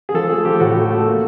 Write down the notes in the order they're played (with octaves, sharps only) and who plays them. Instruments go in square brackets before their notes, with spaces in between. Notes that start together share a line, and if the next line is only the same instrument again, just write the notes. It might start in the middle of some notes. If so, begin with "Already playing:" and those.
[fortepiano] G#4
F3 A4
A3 G#4
F3 G4
A2 F#4
A3
A3
A#3